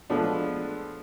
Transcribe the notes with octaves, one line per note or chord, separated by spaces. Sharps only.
F3 G#3 A3 B3 D4